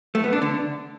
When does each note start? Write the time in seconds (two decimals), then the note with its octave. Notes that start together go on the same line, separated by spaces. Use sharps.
0.15 A3
0.24 B3
0.33 D4
0.42 D3